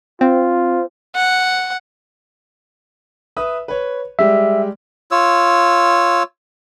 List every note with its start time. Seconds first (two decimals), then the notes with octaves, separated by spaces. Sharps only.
0.21 C4 F4
1.15 F#5
3.37 B4 E5 D#6
3.68 B4 C#5
4.19 G3 G#3 G4 E5
5.11 F4 C#5 E6